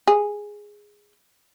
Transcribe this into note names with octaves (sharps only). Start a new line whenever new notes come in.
G#4